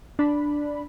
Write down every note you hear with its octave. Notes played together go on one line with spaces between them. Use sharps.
D4 B5